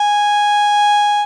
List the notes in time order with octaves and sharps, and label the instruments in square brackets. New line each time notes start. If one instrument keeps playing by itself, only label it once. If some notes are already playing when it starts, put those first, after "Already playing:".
Already playing: [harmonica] G#5